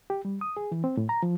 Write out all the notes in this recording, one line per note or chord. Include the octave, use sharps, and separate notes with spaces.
G4
G3
D#6
G#4
E3
C4
A2
A#5
F3